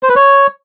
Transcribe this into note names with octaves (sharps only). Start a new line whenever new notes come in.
C5
B4
C#5